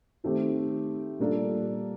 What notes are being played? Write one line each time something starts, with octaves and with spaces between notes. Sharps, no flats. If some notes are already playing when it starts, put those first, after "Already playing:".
D#3 A3 C4 G4
A#2 G3 A#3 D4 A4